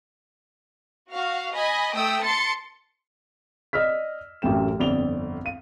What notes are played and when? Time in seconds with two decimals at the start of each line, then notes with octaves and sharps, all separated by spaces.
1.12 F#4 F5
1.54 D#5 G#5 B5
1.95 A3 G5 D#6 E6
2.24 A5 C6 A6 C#7
3.73 D5 D#5 E6 F6 B6
4.42 A1 F#2 A2 G5 E7
4.79 G1 F2 D5 F7 G7
5.45 F5 D#7